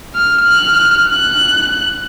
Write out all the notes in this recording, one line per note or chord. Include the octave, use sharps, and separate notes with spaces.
F6
F6 F#6
F#6